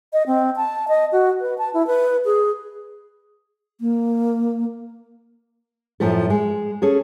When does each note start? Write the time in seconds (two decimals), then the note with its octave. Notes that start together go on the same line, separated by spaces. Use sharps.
0.13 D#5
0.27 C4
0.56 A5
0.88 D#5
1.12 F#4
1.41 B4
1.58 A5
1.74 E4
1.87 B4
2.25 G#4
3.81 A#3
6.00 F#2 A2 F3 A3 A4
6.30 G#3
6.82 C#4 G#4 A4